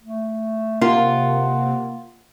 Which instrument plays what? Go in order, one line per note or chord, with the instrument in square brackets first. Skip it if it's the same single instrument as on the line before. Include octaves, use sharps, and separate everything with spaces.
[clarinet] A3
[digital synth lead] C3 [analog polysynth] A#3 [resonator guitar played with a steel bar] F4 [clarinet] F#5